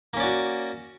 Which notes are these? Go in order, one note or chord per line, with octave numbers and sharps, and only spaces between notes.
A#3 C#4 F#4 D5